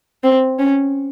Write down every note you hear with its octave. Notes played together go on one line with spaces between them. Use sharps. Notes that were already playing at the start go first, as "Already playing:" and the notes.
C4
C#4